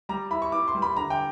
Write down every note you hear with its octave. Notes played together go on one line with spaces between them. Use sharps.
G3 A#5
E4 B5
C#6
E4 D6
C6
G3
B5
D3 A#5
G5